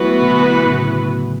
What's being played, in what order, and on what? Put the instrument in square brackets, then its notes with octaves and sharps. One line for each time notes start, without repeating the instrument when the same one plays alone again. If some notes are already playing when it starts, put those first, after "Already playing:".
Already playing: [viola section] E3 B3 F#4 B4 [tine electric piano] F#3 A3
[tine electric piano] B2 D3
A2 C#3